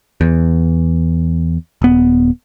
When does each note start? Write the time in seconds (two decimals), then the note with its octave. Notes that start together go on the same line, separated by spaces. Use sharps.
0.21 E2
1.82 D#1 B3